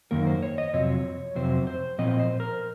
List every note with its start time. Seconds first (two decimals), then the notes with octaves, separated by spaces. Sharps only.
0.11 F#2 D#3 A#3 A#4
0.27 C5
0.42 C#5
0.58 D#5
0.73 F2 C3 F#3 C4 C#5
1.35 F2 C3 F#3 C4 C5
1.67 C5
1.98 A#2 F3 C4 D#5
2.19 C5
2.40 A#4